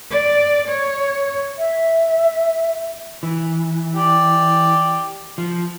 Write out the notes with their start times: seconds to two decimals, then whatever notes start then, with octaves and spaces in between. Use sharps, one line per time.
0.11 D5
0.68 C#5
1.59 E5
3.23 E3
3.94 G4 D5
5.38 F3